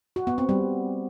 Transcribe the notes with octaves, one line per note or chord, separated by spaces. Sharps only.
F#4
B3
C4
G3